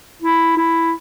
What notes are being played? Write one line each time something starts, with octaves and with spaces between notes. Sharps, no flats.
E4
E4